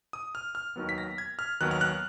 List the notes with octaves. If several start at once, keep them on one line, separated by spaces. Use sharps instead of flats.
D#6
F6
F6
D#2 D#3 F#3 B3
B6
A#6
G#6
F6
D#2 D#3 F#3 B3 F#6
F6
F#6